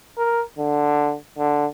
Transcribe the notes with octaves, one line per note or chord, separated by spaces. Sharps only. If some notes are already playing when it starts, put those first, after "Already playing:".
A#4
D3
D3